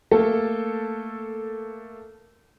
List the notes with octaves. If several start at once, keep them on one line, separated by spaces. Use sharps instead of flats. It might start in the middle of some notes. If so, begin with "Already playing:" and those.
A3 A#3 A4